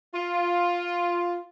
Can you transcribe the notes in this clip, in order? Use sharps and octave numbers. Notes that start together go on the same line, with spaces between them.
F4